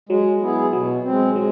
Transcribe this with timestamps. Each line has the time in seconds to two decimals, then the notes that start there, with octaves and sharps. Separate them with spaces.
0.09 F#3 G#3
0.41 B3 E4 G#4
0.73 B2 F#3
1.04 G#3 C4
1.36 F#3 G#3